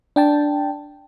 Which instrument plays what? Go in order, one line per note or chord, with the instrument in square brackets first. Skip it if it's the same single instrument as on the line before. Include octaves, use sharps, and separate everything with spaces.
[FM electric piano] D4 G5 A5